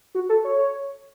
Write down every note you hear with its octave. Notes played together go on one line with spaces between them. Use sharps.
F#4
A4
C#5